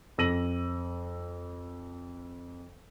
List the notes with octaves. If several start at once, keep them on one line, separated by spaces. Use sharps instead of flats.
F2 E6 A#6 D#7 F#7